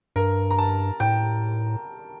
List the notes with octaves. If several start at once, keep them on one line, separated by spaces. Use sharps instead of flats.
G2 A#4
A#5
A5
A2 G5